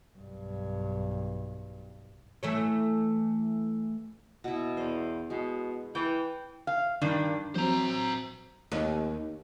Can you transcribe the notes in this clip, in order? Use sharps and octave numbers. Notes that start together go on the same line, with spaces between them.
B1 G2
E3 A3 C#5
B2 E4
E2 C5
B2 G#3
E3 G5
F5
G2 D#3 D4
F#3 C4 C5 A#5
D#2